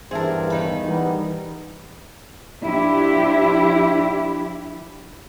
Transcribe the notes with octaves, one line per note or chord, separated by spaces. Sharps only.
E2 G2 G#4 A#4 C5 E5 A5
D#3 D#4 B5
E3 G3 B3 A#5
F3 D4 E4 G4